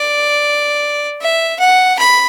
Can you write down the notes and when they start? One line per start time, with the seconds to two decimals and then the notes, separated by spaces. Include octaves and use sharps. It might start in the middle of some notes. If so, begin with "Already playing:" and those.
Already playing: D5
1.21 E5
1.60 F#5
1.99 B5